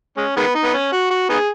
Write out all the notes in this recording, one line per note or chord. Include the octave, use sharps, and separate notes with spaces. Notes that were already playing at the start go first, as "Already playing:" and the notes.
G#3 C#4
D#3 G#3 B3
D#4
B3
C#4
F#4
F#4
B3 D#4 G#4